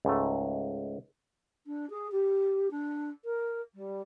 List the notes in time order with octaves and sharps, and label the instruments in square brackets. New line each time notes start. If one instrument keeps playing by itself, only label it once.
[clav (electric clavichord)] C#2 G#2 A3
[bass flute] D4
G#4
G4
D4
A#4
G3